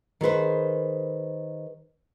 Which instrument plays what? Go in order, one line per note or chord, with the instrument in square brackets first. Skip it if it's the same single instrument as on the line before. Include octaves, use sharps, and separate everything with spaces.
[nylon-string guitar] D#3 G#4 B4 C5